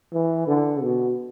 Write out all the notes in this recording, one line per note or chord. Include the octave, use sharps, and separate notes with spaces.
E3
D3
B2